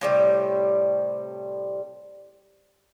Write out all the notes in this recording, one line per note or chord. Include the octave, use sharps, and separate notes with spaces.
A2 C3 G3